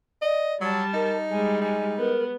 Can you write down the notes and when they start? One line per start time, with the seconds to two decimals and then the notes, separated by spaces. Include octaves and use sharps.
0.22 D5 D#5
0.61 F#3 G3 A5
0.94 D#4 A#4
1.30 G3 G#3 G#5
1.61 D#4 G#5
1.98 B3 A#4